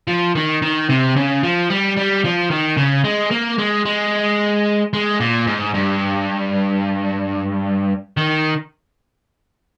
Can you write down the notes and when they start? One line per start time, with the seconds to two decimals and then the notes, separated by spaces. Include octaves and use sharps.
0.07 F3
0.35 D#3
0.62 D#3
0.89 C3
1.16 C#3
1.43 F3
1.69 G3
1.96 G3
2.24 F3
2.50 D#3
2.77 C#3
3.04 G#3
3.31 A#3
3.58 G#3
3.85 G#3
4.93 G#3
5.20 A#2
5.47 G#2
5.74 G2
8.17 D#3